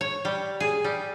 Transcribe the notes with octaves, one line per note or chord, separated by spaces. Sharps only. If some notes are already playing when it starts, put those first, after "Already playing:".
C#5
G3
G#4
G3